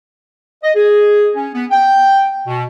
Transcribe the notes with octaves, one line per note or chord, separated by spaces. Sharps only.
D#5
G#4
C#4
B3
G5
B2